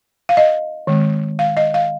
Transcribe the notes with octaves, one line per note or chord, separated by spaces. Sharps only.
F5
D#5
D#3 G#3 C4
F5
D#5
F5